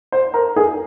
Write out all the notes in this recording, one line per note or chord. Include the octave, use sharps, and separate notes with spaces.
C5
A#4
G#4